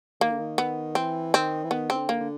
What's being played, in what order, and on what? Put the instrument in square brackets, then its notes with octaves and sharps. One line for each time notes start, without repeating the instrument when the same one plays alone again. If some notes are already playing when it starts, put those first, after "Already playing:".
[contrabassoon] D#3 [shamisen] A#3
[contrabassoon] D3
D#3
[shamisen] B3
[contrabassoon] E3 [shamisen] C4
[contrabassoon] D#3 [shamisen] C4
[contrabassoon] E3
[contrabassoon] D#3 [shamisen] B3
[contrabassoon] C#3 [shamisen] C4
[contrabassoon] D3
[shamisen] A#3
[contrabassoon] D3